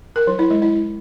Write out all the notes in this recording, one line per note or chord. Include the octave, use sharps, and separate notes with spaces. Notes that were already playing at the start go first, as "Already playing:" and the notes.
A#4
F#3
E4
G#3
E4